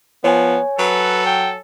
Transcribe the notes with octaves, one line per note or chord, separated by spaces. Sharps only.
F3 B3 C#5 G#5
F#3 A4 B4
G5